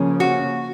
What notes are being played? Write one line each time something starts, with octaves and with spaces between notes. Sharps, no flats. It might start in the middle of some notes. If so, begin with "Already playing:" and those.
Already playing: C#3 F3 A#3 C#4
F#4